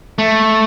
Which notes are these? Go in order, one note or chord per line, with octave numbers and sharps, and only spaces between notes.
A3